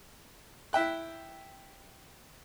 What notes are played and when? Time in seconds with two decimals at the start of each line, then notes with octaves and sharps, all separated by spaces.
0.73 E4 E5 G5 F#6